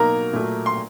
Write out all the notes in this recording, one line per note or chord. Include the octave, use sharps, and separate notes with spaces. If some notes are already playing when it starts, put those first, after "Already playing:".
Already playing: B2 F#3 A#3 D#4 A#4 A#5
A#2 F#3 A3
C6